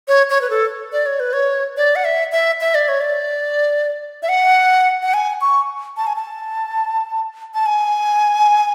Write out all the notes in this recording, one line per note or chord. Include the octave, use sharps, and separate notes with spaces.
C#5
C#5
B4
A4
D5
C#5
B4
C#5
D5
F#5
E5
E5
E5
D5
C#5
D5
E5
F#5
F#5
G#5
C#6
A5
G#5
A5
A5
G#5